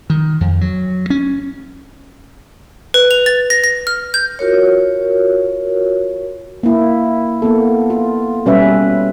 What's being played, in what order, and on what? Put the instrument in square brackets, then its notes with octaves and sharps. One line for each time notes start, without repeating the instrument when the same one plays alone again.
[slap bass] D#3
F2
F#3
C#4
[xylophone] B4
F7
A6
A#6
A#6
F6
G6
[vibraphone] F4 F#4 A#4 C#5
[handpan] A#3 E4
A#3 B3 A4
F4
B2 G3 C#4 B4 E5